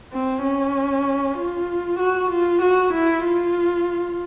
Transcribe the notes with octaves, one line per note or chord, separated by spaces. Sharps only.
C4
C#4
F4
F#4
F4
F#4
E4
F4